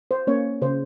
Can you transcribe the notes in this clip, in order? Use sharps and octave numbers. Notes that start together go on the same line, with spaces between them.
C5
A#3 C#4 C#5
C#3 C5